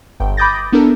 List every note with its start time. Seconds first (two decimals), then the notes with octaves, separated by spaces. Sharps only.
0.20 G1 G5
0.37 B5 D6 D#6 G6 A6 A#6
0.72 B3 D4 E4 A4 A#4